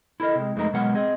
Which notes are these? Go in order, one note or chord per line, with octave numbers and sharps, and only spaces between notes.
E4 A4 A#4 D#5
C3 G#3
F2 G#3 A3 D#4 A#4
B2 F#3 G#3 A#4 F#5
C4 G#4 D#5